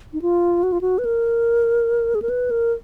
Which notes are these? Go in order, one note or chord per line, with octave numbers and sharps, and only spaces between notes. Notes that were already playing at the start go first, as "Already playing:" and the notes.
D#4
F4
F#4
F4
F#4
B4
A#4
G#4
A#4
B4
A#4